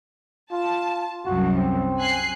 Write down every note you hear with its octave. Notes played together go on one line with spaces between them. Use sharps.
F4 A5
C2 F#2 F#4
C4
G#5 F#6 C7